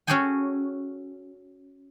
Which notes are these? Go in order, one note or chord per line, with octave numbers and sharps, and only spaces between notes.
C#4 F#4 G#4 A4 G5 G#5